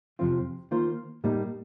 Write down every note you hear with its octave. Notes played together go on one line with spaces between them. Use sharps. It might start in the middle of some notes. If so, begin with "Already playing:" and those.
F2 C3 F3 C4 F4
D#3 A#3 F4 C5
A2 G3 A#3 D#4